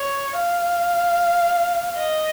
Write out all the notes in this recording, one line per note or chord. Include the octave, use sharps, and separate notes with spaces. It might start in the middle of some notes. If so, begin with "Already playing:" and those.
Already playing: C#5
F5
D#5